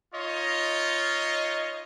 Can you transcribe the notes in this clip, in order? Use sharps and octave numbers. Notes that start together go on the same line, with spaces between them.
D#4 F4 C#5 D#5